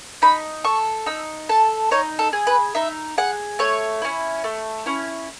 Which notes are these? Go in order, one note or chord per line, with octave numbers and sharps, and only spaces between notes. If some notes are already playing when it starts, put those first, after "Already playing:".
D#4 B5
A4 C#6
D#4 E6
A4 A5
D#4 C#5
A4
G#4
B4
D#4 E5
G#4 F#5
A3 C#5
C#4 E4
A3
C#4 E4